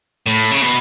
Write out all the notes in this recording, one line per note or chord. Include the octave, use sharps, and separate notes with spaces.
A2
C#3
B2